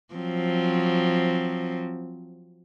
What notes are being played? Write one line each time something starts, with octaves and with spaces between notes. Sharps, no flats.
F3 F#3 C4